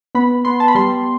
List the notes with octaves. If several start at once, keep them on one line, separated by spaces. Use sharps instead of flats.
B3 B5
B3 C6
A5
B5
G3 C6